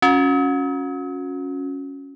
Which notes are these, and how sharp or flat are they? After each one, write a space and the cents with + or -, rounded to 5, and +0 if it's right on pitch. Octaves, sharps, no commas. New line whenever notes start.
C#4 +0 F#4 -30